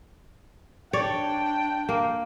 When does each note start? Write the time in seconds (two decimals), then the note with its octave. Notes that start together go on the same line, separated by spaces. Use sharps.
0.93 D4 C#5 D5 G5
1.89 A#3